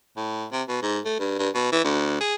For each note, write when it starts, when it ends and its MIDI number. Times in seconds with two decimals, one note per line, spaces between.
0.17 0.46 45
0.52 0.63 48
0.68 0.83 47
0.83 0.99 44
1.05 1.16 57
1.20 1.35 43
1.39 1.49 43
1.55 1.68 47
1.72 1.81 52
1.84 2.17 38
2.21 2.35 68